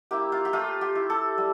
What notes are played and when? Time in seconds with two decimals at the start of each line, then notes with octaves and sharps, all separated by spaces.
0.11 A#3 E4 G4
0.32 F4
0.45 G4
0.53 A3 F4
0.81 G4
0.95 E4
1.10 A4
1.38 G3